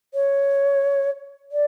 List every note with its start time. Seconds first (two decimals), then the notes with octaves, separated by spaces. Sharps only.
0.14 C#5
1.52 D5